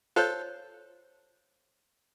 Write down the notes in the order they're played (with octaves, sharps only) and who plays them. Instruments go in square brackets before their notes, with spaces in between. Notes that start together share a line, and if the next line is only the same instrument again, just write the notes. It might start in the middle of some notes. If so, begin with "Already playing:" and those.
[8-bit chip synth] F4 A4 [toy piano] C5 C#5